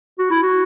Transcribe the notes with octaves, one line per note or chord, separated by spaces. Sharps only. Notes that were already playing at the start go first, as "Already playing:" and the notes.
F#4
E4
F#4